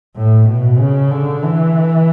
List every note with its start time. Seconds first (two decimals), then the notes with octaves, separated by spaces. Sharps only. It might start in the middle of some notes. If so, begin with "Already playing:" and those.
0.17 A2
0.49 B2
0.79 C#3
1.11 D3
1.42 E3